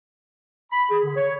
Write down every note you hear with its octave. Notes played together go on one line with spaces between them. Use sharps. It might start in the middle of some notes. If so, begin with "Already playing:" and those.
B5
G#4
D3
C#5